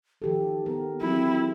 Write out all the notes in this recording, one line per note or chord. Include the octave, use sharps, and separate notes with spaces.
D#3 F3 G4 A4
B3 A#4
E3 F#3 C4 E4